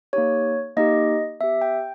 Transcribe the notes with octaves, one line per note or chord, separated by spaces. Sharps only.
A#3 D#4 G4 C#5
A#3 D#4 G4 D#5
B3 G4 E5
G5